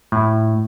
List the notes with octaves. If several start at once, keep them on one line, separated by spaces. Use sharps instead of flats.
A2